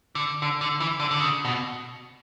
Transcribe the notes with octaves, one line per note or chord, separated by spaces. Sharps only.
D3
D3
D3
E3
D3
D3
C#3
B2